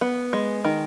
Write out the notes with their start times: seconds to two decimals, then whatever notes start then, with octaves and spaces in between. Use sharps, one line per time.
0.01 B3
0.33 G#3
0.65 D#3